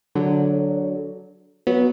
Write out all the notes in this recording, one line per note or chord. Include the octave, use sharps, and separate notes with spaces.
D3 F#3
F#3 B3